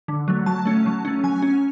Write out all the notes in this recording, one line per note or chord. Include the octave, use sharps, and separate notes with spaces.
D3
F#3 A3
F#3 A5
A3 C#4
F#3
A3 C#4
F#3 G#5
C#4